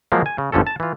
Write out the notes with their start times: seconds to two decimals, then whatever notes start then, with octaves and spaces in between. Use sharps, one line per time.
0.12 F3 F#3 G#3 A#3
0.26 G#5
0.38 C#3
0.52 G1 D3 F3 C#4 A4
0.67 A5
0.80 E3 F4